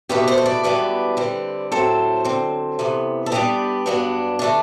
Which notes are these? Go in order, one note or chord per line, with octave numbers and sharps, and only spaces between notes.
E2 B2 A3 G4 B4
A4 C5
C5
B4 D5
F#2 E3 G3 B3 D4 B4 D5
D3 G3 C4
A2 F#3 C4 A4 C5
D3 F#3 C4
C3 E3 B3
A4
D3 G3 B3 D4 G4 B4
G2 F#3 B3 D4
D3 A3 D4